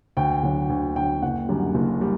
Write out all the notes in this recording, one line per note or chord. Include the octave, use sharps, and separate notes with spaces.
D2 G5
D3 F#3
D2
D3 F#3 G5
F#1 F#5
F#2 D3 G3
F#1
G3